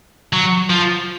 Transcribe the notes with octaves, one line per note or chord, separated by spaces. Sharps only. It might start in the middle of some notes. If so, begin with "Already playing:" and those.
F#3
F3